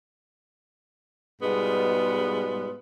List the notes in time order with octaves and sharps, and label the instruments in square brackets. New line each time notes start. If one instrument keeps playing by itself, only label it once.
[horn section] G#2 B2 G3 G#3 B3 F4